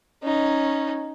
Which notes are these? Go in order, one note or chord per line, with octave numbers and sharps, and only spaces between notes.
C#4 D#4